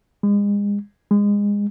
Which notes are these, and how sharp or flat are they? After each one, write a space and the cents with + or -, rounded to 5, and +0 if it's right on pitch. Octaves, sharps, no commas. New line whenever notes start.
G#3 -35
G#3 -25